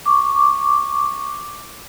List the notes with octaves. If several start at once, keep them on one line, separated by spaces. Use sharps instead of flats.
C#6 D6